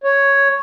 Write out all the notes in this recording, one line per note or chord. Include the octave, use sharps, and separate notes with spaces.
C#5